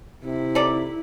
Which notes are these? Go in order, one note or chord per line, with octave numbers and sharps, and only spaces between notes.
C3 E4
D#4 A4 D5